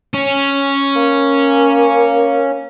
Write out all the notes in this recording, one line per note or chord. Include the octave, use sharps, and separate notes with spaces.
C#4
A#3